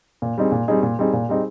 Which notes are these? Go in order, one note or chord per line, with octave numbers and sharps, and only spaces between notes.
A#2
G3 C4 D#4 G#4
A#2
G3 C4 D#4 G#4
A#2
G3 C4 D#4 G#4
A#2
G3 C4 D#4 G#4